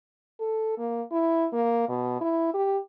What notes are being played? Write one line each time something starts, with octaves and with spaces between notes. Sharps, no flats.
A4
A#3
E4
A#3
B2
E4
G4